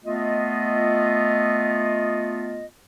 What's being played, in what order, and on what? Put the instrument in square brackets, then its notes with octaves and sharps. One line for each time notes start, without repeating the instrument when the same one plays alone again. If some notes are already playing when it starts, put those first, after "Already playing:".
[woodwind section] A3 B3 F4 D#5